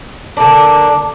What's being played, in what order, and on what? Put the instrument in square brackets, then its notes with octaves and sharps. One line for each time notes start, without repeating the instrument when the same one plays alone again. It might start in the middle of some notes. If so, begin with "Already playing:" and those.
[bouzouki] D3 A#3 D4